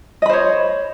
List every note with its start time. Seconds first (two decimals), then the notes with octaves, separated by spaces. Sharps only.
0.22 D#5
0.26 B5
0.29 C5
0.33 C#5